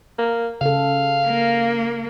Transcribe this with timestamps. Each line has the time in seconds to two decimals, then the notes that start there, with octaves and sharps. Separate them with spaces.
0.19 A#3
0.61 C#3 A4 F5
1.27 A#3